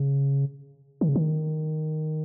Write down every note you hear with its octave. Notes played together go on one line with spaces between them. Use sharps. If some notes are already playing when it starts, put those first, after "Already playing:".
Already playing: C#3
D#3
C#3
D#3